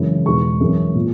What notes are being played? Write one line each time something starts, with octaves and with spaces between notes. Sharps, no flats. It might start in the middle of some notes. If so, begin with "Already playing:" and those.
Already playing: F#2 C#3 E3 G#3
E2 B2 G#3 C#6
F#2 E3 G#3
A#2